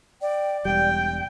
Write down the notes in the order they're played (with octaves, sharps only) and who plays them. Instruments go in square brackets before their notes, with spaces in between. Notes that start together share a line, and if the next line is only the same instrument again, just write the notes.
[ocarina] D5 [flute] G5
[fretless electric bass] E1 G3 [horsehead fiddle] G5 [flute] G6